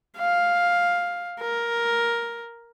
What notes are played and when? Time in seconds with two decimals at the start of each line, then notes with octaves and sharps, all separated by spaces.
0.17 F5
1.40 A#4